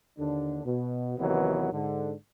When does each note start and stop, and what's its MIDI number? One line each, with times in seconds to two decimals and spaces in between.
0.19 0.61 39
0.19 0.61 50
0.19 0.61 62
0.65 1.17 47
1.18 1.70 39
1.18 1.70 48
1.18 1.70 51
1.18 1.70 52
1.18 1.70 54
1.18 1.70 59
1.72 2.13 44
1.72 2.13 50